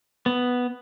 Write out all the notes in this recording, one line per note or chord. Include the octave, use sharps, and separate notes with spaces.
B3